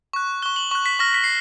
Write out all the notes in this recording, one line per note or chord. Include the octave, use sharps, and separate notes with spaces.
C#6 F#6
C#6 F#6 G7
F#7
C#6 F#6
B6
C#6 F6 A#6
B6
C7